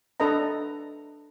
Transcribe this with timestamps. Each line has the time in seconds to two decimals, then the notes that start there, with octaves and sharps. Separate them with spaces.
0.20 D4 A4 B4 D#5 A#5